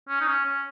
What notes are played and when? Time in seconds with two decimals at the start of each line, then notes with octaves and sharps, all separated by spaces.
0.09 C#4
0.21 D#4
0.27 C#4
0.45 C#4